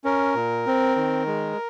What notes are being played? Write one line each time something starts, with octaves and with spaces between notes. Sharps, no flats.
C#4 A#4
A#2
C4
D#3
G#3